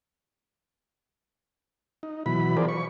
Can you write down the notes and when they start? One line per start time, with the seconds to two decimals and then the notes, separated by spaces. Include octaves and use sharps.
2.03 D#4
2.26 B2 E3 F#3 B5
2.57 E3 F3 G#4 A#4 C5 D5
2.68 C#6